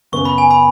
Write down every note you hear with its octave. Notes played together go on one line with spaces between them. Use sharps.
F#2 C#3 B3 C#6
B5
G#5
B5